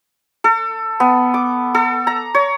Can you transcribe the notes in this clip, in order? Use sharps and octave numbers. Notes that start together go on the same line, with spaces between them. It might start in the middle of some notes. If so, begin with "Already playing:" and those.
A4
B3
D6
A4
A#5
C#5